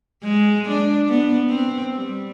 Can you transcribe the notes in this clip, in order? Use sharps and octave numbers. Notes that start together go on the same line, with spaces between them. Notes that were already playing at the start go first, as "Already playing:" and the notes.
G#3
D4
B3
C4
G3